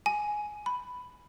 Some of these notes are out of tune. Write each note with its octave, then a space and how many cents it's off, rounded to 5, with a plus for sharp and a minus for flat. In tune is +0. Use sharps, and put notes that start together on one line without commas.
G#5 +10
B5 +5